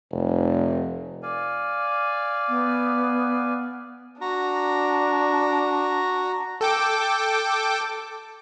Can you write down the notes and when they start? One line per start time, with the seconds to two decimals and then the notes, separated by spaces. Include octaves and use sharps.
0.11 F1
1.23 D5 F5 G#5
2.49 B3
4.21 D4 F#4 A#5
6.61 A4 G5 D6